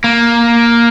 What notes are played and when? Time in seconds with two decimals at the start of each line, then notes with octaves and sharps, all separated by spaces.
0.04 A#3